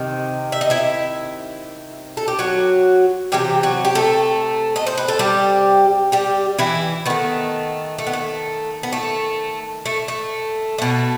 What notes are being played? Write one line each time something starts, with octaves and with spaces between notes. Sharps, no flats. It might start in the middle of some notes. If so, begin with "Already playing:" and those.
Already playing: C3 D#3
E5
D#5
E4 E5
A4
G4
F#3 F#4
C3 E3 G3 G4
F#3 F#4
G4
A3 A4
D#5
C5
B4
A4
G3 G4
G3 G4
E3 E4
D#3 A3 B3
A3
B3
A3
B3
A3
A3
A3
B2 A3